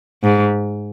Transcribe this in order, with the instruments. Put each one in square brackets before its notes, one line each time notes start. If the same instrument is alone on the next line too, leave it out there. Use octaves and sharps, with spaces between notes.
[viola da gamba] G#2